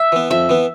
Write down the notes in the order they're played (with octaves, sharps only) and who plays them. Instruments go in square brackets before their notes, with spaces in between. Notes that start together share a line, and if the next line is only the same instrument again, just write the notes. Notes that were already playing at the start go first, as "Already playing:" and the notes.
Already playing: [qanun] E5
[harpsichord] E3 B3
[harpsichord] F2 [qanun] E5
[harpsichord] E3 B3